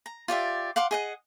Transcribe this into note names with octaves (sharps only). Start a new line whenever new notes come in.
A#5
F4 G4 D5 E5
F5 F#5 C6 D6
G#4 D#5 F#5